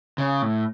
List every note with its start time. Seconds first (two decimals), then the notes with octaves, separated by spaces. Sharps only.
0.18 C#3
0.42 A2